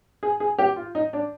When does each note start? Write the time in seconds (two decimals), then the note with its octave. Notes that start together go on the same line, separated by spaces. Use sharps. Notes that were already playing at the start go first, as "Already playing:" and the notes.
0.23 G#4
0.40 G#4
0.58 G4
0.76 F4
0.95 D#4
1.13 D4